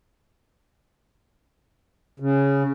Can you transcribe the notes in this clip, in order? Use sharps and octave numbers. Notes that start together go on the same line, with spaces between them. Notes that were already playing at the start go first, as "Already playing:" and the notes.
C#3